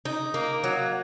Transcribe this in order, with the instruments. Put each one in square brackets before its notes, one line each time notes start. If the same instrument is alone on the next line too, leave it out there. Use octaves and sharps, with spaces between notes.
[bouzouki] D#4
A#3
F#3